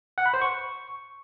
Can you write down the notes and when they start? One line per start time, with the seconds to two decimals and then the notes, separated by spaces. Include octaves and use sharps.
0.18 F#5
0.26 B5
0.34 C5
0.42 C#6